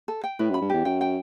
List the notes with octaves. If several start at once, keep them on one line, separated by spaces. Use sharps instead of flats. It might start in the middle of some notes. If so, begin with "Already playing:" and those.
A4
G5
A2 B4
F#2
B5
G2
E2 G4
F#2 G5
G5